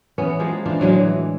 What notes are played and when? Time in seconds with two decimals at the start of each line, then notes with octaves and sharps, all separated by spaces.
0.18 E3 B3 C#4
0.40 F3 G#3 A#3
0.65 E3 F3 D4 F4
0.80 A2 D3 F#3 G#3
0.99 E3